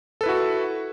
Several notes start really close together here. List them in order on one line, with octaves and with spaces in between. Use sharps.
A4 B4 E4 F#4